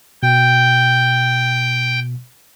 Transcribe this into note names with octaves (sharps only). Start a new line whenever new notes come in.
B2 G5